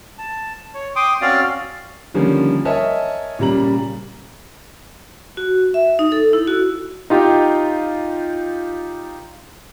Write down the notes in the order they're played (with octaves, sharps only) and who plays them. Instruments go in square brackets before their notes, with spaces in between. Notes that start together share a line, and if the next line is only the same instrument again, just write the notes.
[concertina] A5
C#5
G5 C6 D6 D#6
C4 C#4 F#4 D5 F5
[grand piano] D3 D#3 F3 G3 A#3 C#4
A#4 C#5 D#5 E5 G#5 A5
A#2 C#3 G3 A#5 F#7
[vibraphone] F#4
E5
D#4
A4
E4
F#4
[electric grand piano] D#4 F4 G4